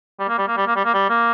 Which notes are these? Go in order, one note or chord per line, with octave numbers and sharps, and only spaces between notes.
G3
A#3
G3
A#3
G3
A#3
G3
A#3
G3
A#3